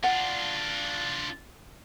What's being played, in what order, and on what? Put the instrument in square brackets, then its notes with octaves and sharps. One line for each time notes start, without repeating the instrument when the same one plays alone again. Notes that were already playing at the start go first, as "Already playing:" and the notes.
[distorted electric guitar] D4 F4 [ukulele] F#5